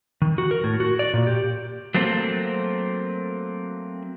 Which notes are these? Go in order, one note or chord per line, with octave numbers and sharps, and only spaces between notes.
D#3
F#4
A#4
A2
F#4
D5
A#2
G4
F#3 A3 A#3 C4